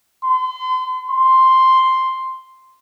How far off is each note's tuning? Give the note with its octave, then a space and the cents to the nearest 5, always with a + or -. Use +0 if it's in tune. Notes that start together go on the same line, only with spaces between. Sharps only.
C6 -35
C6 +0